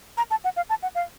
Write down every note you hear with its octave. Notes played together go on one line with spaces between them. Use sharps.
A#5
A5
F#5
F5
A5
F#5
F5